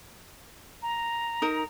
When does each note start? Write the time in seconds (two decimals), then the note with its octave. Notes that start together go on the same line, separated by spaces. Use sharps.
0.82 A#5
1.42 D#4 A#4